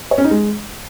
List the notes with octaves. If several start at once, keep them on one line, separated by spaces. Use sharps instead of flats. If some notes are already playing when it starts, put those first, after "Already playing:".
C#5
C#4
D#4
G#3